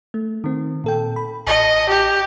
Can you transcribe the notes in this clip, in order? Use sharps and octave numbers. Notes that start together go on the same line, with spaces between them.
A3
D#3 C4
A#2 A4 G5
B5
A1 D#5 A5 C#7
G4